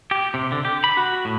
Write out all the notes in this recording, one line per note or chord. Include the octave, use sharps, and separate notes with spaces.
G4
C3
D3
G4
B5
F#4
A2